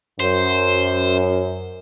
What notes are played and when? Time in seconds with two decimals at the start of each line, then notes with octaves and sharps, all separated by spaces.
0.20 F#2 C5